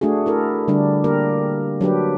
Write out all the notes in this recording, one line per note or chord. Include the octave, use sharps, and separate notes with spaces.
A3 D4 F#4 G#4
E4 A4 A#4
D3 G3 D4
A#3 G4 A#4
F#3 D4 G4 B4